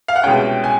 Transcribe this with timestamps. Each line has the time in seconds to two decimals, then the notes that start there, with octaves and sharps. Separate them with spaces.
0.08 F5
0.16 F#5
0.23 C2 B2 G#3 C#4 G5
0.64 G#5